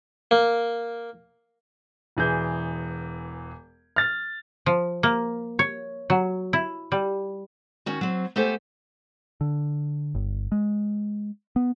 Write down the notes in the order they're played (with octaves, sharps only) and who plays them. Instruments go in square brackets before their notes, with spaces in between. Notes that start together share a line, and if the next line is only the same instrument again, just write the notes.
[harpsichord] A#3
[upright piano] E1 E3 G#4 G6
F6 A6
[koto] F3
A#3
C#5
F#3
E4
G3
[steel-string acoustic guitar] D#3 C#4 F#4
F#3 C4
A3 B3 G4 A4 C5 G#5
[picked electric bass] D3
G1
G#3
B3